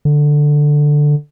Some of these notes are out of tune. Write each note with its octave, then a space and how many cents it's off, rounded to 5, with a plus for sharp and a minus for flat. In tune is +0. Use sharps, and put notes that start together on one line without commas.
D3 +5